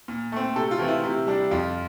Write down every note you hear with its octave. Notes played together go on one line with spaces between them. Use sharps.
A#2
A3 C4
C3 A4
F4
E3 A3 C4
E4
C3
G3 D4
F2 F4